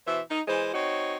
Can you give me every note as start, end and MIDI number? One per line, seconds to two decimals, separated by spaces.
0.06 0.20 47
0.06 0.20 52
0.06 0.20 72
0.06 0.20 76
0.29 0.40 63
0.47 0.69 52
0.47 0.69 56
0.47 0.69 72
0.74 1.17 60
0.74 1.17 63
0.74 1.17 66
0.74 1.17 73